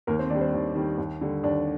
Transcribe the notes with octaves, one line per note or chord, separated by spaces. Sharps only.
D#2 A#3 A#4
C4 C5
D#3 D4 D5
G3
C4 C5
D#2
D#3 G3
D#2
D3 G3
D#2 D4 D5